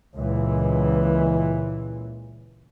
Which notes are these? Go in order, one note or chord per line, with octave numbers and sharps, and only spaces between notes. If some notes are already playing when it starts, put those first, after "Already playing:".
C#2 A#2 E3